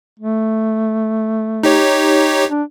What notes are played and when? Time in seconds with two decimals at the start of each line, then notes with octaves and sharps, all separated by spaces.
0.20 A3
1.63 D#4 G4 C#5
2.50 D4